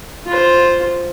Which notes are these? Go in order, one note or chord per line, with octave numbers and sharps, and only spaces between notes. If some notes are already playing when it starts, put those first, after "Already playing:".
F4 C5